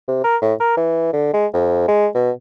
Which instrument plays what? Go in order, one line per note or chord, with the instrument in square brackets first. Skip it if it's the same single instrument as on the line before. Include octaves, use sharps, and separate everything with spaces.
[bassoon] C3
A#4
A2
A#4
E3
D3
G#3
F2
G#3
B2